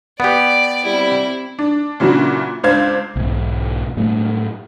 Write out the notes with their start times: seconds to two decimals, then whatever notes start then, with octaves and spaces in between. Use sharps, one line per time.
0.20 B3 G4 D5
0.86 G3 C4 E4
1.59 D4
2.00 A#2 C#3 E3 F#3 D4 F#4
2.63 C#2 D4 C5 F5 G#6
3.16 B1 E2 G#2
3.97 A2 F#3 G3 A3